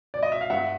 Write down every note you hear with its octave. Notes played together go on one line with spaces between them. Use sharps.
D5
D#5
E5
F5
G2 E5 F#5